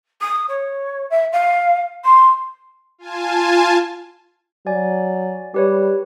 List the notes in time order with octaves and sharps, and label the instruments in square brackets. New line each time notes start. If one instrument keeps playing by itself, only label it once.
[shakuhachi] D#6
C#5
E5
F5
C6
[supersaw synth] F4 G#5 A5
[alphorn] F#3 [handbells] D5 G#5
[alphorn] G3 [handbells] G4 B4 C#5